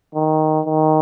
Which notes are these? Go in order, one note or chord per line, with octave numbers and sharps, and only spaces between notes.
D#3
D#3